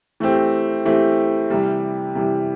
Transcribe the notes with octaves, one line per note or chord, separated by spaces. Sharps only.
E3 A3 C4 G4
E3 A3 C4 G4
C3 E3 G3
C3 E3 G3